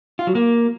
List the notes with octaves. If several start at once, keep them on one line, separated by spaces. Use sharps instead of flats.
F4
F#3
A#3